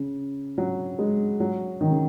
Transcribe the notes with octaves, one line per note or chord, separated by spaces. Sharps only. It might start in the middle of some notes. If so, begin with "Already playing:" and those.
Already playing: C#3
F#3
G#3
F#3
D#3
C#3